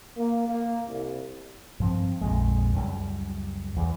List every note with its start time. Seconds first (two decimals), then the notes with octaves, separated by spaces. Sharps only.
0.16 A#3
0.48 A#3
0.88 C2
1.80 G2 F3 C4
2.21 A#1 F2 G#3
2.75 C#2 F#2 G3
3.76 E2